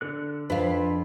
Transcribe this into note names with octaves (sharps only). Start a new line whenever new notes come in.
D3 A4 F#6
F2 D4 F4 B4 F5 B5